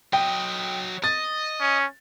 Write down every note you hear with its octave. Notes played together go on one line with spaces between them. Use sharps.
F#3 D#5 G5
D#5 A6
C#4